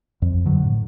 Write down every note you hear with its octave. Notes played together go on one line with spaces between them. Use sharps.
F2
G2 D3 F#3
A2